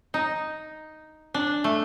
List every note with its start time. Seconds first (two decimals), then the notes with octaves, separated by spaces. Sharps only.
0.14 D#4
1.34 D4
1.64 A3